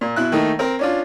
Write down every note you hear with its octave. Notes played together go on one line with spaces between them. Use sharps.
A#2
B2 E4 F#6
D#3 A3 A#3 D#4
C4 A#4
C#4 D4 F4